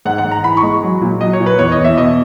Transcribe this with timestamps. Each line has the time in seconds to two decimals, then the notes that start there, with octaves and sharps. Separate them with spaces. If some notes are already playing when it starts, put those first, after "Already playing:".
0.05 G#2 F#5
0.18 F#5
0.25 G#2
0.31 A#5
0.43 E3 B5
0.57 C#6
0.63 G#3
0.83 F#3
1.01 A#2
1.21 F#3 D#5
1.33 C#5
1.40 A#2
1.46 B4
1.59 E2 C#5
1.72 D#5
1.78 E2
1.84 E5
1.97 B2 D#5